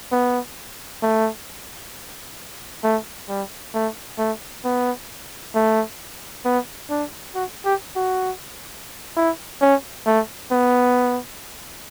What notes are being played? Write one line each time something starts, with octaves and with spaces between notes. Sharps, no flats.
B3
A3
A3
G3
A3
A3
B3
A3
B3
D4
F#4
G4
F#4
E4
C#4
A3
B3